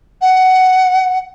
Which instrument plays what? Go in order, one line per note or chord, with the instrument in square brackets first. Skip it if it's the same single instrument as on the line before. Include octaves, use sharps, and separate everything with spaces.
[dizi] F#5